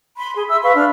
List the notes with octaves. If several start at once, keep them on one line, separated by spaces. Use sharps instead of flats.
B5 C6
G#4 C6
E5 E6
B4 F5 B5 C#6
D4 F6